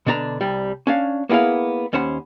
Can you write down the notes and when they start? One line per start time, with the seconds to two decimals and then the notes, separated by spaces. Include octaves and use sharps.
0.06 B2 D3 D4 D5 A#5
0.41 C2 G3
0.87 C#4 D4 F5
1.29 A#3 B3 E4 G#4 F5
1.93 D#2 C#4 C5 F#5 B5